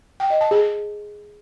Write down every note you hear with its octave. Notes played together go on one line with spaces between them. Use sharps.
G5
D#5
A5
G#4